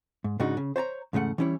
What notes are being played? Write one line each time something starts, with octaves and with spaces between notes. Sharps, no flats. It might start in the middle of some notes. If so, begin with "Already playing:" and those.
G#2
G#2 C#3 D4 D#4 F#4
C#3
C5 C#5 A5 A#5
E2 G#2 C#3 A3 F#5
E3 G3 C#4 E4 C#5